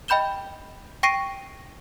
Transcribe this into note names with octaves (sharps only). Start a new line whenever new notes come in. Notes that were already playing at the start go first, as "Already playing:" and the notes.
D#5 G5 B5 G6 E7 G7
G5 C#6 A#6 C7 D7 D#7